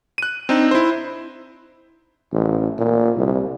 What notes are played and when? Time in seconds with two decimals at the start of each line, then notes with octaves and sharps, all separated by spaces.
0.18 F#6 D#7
0.49 C4 D4 D#4
0.71 E4 C5
2.32 A1
2.78 A#2
3.15 C2